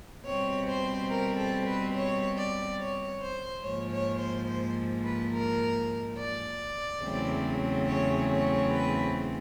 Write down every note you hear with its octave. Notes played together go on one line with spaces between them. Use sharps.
B2 G3 C4 C#5
C5
A#4
A4
B4
C#5
D5
C#5
C5
G#2 F3 A#3 C#5
C#5
C5
C5
B4
A#4
D5
E2 C#3 F#3 A3 C4
C#5
C#5
B4